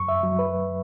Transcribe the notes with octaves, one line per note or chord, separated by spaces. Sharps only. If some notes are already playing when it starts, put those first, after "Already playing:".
Already playing: F#2 C#6
E5
F#3
B4